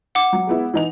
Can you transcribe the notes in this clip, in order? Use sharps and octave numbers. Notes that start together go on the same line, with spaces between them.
F#5 D6
F#3
G#3 B3 E4
E3 D#4 F7